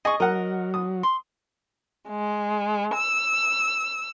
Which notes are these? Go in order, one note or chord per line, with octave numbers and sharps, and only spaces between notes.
G#4 D#5 C#6
F#3 A#4 D#5 F#5
D#6
C6
G#3
E6